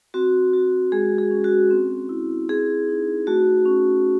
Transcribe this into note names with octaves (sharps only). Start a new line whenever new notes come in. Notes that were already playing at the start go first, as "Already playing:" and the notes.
C4 F#4
F#4
G#3 G#4
G#4
C#4
F#4
C4
E4
C4 G#4
D#4
A3 F#4
C#4